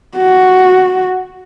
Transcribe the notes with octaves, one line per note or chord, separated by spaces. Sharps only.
F#4